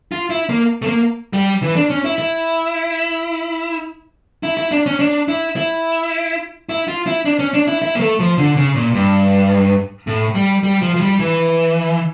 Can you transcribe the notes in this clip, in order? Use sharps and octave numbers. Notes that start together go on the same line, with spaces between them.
F4
E4
A#3
A3
A#3
G3
E3
D4
C#4
E4
E4
E4
E4
D4
C#4
D4
E4
E4
E4
F4
E4
D4
C#4
D4
E4
E4
A#3
A3
F3
D3
C#3
A#2
G2
A2
G3
G3
F3
F3
G3
E3